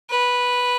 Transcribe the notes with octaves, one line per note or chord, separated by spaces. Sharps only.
B4